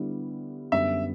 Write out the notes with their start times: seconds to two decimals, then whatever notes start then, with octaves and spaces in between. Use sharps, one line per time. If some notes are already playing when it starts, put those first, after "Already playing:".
Already playing: D3 G3 B3 E4
0.72 F#2 D3 G3 B3 E5